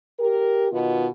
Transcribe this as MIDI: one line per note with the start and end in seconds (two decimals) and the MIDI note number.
0.19 0.67 67
0.19 0.67 70
0.72 1.07 47
0.72 1.07 51
0.72 1.07 59
0.72 1.07 65